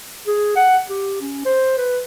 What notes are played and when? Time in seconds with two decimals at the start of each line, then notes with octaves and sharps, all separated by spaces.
0.27 G#4
0.56 F#5
0.89 G4
1.21 C#4
1.45 C5
1.77 B4